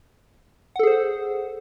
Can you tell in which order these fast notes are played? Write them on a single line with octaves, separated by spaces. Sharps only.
F#5 A4 G#4 C5